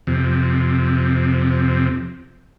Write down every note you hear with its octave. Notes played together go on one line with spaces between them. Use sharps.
F2 C3